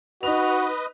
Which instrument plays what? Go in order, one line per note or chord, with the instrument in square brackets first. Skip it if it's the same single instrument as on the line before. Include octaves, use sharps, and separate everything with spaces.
[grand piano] D#4 F7 [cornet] F#4 [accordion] B4 D#5